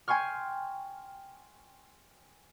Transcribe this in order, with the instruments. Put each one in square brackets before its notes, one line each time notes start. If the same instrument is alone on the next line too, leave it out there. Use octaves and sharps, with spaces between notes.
[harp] G5 G#5 C6 C#6 F6